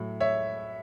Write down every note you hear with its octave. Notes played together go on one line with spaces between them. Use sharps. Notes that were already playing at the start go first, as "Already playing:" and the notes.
Already playing: A2 F#3 A3
C#5 E5